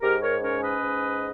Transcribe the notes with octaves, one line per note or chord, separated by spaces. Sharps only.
G#2 G4 A#4
A#4 C#5
C#4 A#4 C#5
B4 D#5
G#2